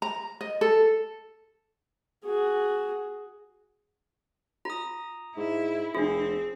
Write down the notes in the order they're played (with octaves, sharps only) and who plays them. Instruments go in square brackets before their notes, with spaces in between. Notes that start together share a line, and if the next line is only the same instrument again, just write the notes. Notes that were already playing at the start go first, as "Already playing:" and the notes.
[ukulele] A#5
D#5
A4
[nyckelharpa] F#4 G#4
[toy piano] F4 [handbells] A#5 D#6
[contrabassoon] G#2 [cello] E4
[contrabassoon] F1 [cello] C4 [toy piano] D4 F4 [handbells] G#4